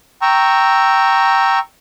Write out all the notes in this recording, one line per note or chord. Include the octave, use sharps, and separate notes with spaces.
G5 A#5 C#6 E6